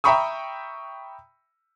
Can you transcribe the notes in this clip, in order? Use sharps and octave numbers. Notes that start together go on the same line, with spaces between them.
E5 G5 A#5 B5 C#6 D#6